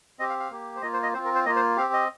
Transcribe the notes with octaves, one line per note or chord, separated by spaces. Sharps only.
C4 G4 D#5
F5
F5
A#3 G4
C5
A#3 F4 D#5
C5
D#5
C4 F4 C5
A#4
C5
A#3 F4 D#5
C5
C4 G4 F5
D#5